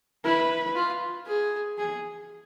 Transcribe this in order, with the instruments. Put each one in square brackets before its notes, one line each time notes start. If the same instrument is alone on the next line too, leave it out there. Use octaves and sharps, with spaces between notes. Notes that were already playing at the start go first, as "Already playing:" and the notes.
[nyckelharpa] E4 [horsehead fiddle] B4
[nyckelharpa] F4
G#4
[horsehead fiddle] G#4